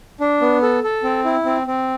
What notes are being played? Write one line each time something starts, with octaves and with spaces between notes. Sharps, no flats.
D4
B3
A4
A4
C4
E4
C4
C4